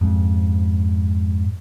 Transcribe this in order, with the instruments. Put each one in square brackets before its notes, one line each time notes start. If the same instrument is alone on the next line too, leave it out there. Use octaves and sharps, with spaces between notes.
[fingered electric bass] F2 G#2